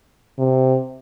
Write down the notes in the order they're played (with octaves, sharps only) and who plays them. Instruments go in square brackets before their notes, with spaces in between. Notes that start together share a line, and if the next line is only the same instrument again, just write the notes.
[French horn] C3